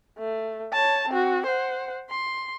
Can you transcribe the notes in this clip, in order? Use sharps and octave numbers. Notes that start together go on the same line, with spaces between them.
A3
C#5 A5
C4 F#4
C5 F#5
C6